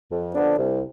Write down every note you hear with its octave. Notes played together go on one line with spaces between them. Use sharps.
F2
D3 F3 B3 D4
C2